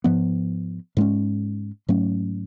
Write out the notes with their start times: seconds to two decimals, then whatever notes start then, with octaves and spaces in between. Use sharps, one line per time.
0.04 G#2 F3 B3
0.97 G#2 G#3 C#4
1.89 G#2 F#3 A3 C#4